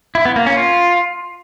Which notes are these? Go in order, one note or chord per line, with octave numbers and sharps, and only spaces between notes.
E4
B3
A#3
C#4
F4